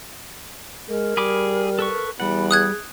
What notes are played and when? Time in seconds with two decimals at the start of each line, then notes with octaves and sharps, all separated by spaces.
0.88 G#3 A#4
1.17 G3 G#4 B5 D6
1.79 A4 B4 C#6
2.20 E2 G3 F#5 B5
2.51 G#4 D#6 F#6 G#6